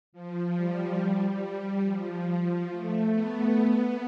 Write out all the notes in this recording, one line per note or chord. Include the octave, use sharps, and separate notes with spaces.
F3
G3
G3
F3
F3
A3
B3
B3